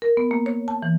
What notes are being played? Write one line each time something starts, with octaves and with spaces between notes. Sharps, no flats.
A#4
B3
A#3
C#5
A5
E3